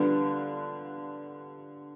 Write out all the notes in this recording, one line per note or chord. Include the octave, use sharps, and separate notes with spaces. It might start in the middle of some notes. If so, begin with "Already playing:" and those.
Already playing: D3 G3 B3 D4 F4